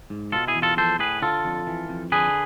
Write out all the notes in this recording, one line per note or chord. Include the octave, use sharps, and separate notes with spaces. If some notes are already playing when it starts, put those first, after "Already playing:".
G#2
B2 F4 A4
E4 G#4
E2
F4 A4
F3 A4 C5
A2 G#4 B4
D3 F4 A4
F2
E3
F2
D3 G#4 B4